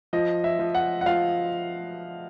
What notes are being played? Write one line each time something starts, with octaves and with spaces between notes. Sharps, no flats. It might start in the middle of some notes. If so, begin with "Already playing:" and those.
F3 D#5
E5
F3
F#5
F#5
F3 F5